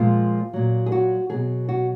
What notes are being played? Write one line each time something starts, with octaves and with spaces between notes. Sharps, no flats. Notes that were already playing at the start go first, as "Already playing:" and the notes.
Already playing: A#2 F3 G#3 F4
A#2 F#3
G#4
F#4
B2 F#3 G#4
F#4